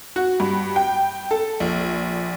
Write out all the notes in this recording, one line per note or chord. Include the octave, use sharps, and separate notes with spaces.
F#4
G2
G5
A4
A#1